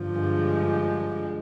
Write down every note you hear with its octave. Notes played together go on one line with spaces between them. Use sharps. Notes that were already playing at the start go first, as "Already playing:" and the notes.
Already playing: G2 D3 F3
G#3